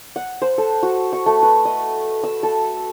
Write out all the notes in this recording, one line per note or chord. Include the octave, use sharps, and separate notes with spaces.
F#5
C5
A4
F#4
C#6
A3
B4
D#5
E6
A4